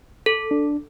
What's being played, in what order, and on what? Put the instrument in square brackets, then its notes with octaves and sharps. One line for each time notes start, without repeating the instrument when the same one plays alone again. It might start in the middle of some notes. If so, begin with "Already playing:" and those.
[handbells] A4
[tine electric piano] D4